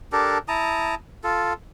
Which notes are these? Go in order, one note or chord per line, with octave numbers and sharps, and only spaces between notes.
D4 G4 A4 A#4
E4 A5 A#5 D#6
F4 A4